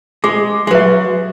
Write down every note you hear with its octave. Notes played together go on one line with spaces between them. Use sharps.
G#3 G#4
G#3
F#3 B4 E5